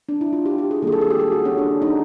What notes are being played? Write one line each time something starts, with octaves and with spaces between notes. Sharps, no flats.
D4
E4
F4
G4
G4
G#4
D#3 G3 A#3 G#4 A4
A4
G#4
G4
G#4
F#4
C#4
D4
D#4